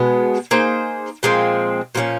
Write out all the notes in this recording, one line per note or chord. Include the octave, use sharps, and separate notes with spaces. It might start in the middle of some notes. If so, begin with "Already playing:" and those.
Already playing: B2 G#3 B3
A#3 D#4 G#4 C5
A#2 F3 G#3 C4
A#2 F3 A#3 C#4